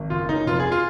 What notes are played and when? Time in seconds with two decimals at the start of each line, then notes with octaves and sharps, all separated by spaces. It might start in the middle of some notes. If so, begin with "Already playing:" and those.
Already playing: G#1
0.10 F#1 F4
0.29 C#3 D#4
0.46 F1 F4
0.60 G#4
0.72 F4